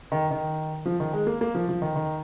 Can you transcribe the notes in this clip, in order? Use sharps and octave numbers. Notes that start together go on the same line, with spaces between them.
D#3
D#3
F3
D#3
G#3
A#3
A#3
F3
F3
D#3
D#3